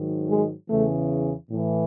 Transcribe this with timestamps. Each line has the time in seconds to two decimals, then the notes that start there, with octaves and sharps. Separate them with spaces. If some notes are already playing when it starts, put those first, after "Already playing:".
Already playing: G#2 D#3 F#3
0.29 G#3
0.69 E2 C#3 E3 A3
1.50 A2 E3